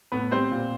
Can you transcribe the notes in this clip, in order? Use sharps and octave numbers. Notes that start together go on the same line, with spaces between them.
A2 B3 B4
G3 C4 C5
A#2